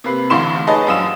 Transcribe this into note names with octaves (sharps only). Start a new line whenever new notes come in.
C3 A#3 B4 C7
A1 D2 A2 F5 C6 E7
D#4 G#4 B4 C#5 D#5 A5
A#1 F#2 F5 D#6 E6 E7